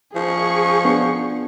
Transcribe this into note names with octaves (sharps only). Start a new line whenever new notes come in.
F3 G#4 C#6
B3 D4